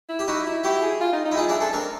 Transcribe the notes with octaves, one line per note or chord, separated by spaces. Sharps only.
E4
G4
D#4 E4 F#4
E4
E4 F#4 G4
G#4
F4
D#4
D#4
E4
D#4 F4 G#4
D4 E4 G#4
C4 D4 A4
C4 D4 A#4